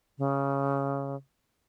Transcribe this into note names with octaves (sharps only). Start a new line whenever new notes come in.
C#3